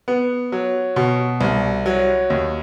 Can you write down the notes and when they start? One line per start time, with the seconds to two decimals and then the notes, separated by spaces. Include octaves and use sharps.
0.08 B3
0.52 F#3
0.96 B2
1.41 C2
1.86 F#3
2.30 D#2